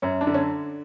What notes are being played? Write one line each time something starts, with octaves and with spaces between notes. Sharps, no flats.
F#2 C#4
D4
D3
C#4